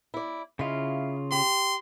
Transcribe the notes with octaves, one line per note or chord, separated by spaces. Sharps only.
E4 D5
C#3 E4 F4 D#5 F5
G4 C6